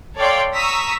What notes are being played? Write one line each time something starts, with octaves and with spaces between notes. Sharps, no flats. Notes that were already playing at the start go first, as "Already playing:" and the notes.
A4 C#5 D5 F5 G5 C6
A#5 C#6 D#6 E6 B6